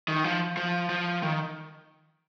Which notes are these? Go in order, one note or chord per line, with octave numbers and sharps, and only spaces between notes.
D#3
F3
F3
F3
D#3